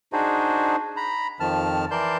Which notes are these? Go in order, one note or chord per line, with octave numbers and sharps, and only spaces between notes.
D4 D#4 F#4 G#4 C5
A#5 B5
F2 D#3 F3 A5 F6
E3 A#4 D5 A5 C6 G6